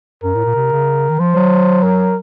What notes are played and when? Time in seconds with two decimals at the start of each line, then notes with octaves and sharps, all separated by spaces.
0.23 F#2 A#4
0.35 A2
0.45 A#2
0.55 C3
0.72 C#3
1.09 D#3
1.19 F3 C5
1.36 F#3
1.83 A#4